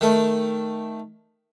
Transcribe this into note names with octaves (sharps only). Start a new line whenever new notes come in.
D#3 A3